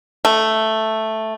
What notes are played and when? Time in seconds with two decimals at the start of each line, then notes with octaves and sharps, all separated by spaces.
0.25 A3